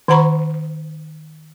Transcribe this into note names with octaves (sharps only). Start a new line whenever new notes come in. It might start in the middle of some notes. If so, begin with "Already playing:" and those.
D#3 C5 F#5 A#5 B5 C#6